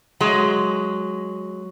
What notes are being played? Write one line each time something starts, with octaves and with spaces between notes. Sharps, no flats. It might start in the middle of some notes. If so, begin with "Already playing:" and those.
F#3 G#3